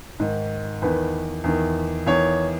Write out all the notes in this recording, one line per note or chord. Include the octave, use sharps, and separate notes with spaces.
G#2 D#3
E2 D#3 B4
E2 D#3
E2 D#3 C#5